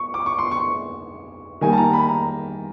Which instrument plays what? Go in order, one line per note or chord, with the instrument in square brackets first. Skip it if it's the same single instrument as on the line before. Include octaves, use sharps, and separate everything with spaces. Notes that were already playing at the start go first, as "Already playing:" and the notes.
Already playing: [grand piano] C#6
D6
C#6
C6
C#6
D#3 G3 A#3 G#5
A5
A#5
B5
A#5